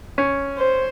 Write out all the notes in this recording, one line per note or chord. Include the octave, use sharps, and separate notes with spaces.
C#4
C5